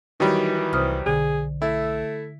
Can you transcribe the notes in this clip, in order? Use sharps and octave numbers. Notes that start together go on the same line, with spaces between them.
D#3 E3 F#3 G3 D#4
C2 C5 D#6 F6
B1 D3 G#4
A3 E4